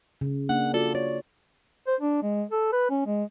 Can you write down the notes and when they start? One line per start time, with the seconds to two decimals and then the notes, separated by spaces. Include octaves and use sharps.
0.21 C#3
0.49 A#3 D4 F#5
0.74 F4 F#4 A4 D5
0.94 C#5 D5
1.87 C5
2.01 D4
2.22 G#3
2.51 A4
2.72 B4
2.90 C#4
3.06 G#3